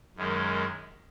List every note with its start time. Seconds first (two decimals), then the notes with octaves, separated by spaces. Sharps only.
0.16 F#2 D#3 G#3